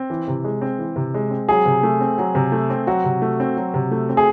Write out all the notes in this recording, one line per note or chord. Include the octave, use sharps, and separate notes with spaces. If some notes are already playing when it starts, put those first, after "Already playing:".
Already playing: C4
E3
C3
G#3
C4
E3
C3
G#3
C4
F#3 G#4
C3
A3
C4
F#3
C3
A3
C4
F#3 F#4
C3
A3
C4
F#3
C3
A3
C4
G#4